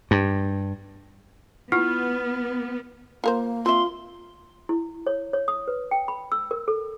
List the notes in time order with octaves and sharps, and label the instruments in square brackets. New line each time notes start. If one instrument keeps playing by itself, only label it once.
[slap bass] G2
[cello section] B3 [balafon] E4 F4 F#5 [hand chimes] F6
[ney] A#3 [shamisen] F4 A#4 C5
[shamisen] C4 E5 [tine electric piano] F4 [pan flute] C6
[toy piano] E4
C#5
C#5
D#6
B4
G5
B5
E6
A#4
A4